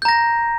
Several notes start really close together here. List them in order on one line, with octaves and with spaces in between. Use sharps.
G6 A#5 A#6